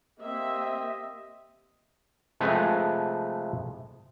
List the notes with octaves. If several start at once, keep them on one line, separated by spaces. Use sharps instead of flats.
A#3 C4 G4 D#5 E5
C3 F3 G#3 A3 B4